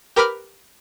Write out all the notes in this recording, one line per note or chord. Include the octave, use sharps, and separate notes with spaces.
G4 A#4 B4 B5 D6 F6